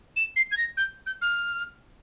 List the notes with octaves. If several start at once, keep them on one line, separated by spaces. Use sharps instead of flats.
E7
C7
G#6
A#6
G6
G6
F6